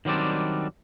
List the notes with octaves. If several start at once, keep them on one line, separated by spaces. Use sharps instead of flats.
D#3 F#3 G3 C4 D4